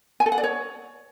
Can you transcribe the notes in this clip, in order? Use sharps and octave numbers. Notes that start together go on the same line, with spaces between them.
G#5
A4
F#5
D5
C#5